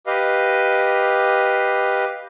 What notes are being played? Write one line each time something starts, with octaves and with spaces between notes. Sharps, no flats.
G4 B4 D#5 F5